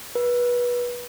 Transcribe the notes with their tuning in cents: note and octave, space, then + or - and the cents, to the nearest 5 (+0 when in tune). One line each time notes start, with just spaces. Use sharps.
B4 -25